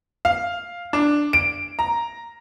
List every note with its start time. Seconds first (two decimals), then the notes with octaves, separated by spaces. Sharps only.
0.25 F5
0.93 D4
1.33 D7
1.79 A#5